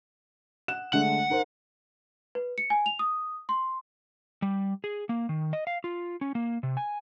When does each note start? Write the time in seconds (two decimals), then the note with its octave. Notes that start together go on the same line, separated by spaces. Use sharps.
0.68 F#5 F#6 E7
0.93 D3 G#3 A3 F#5
1.30 D#4 A#4 C5
2.35 B4
2.58 C#7
2.70 G#5
2.86 F7
2.99 D#6
3.49 C6
4.42 G3
4.84 G#4
5.09 A#3
5.29 D#3
5.53 D#5
5.67 F5
5.84 F4
6.21 C#4
6.35 A#3
6.63 C3
6.77 G#5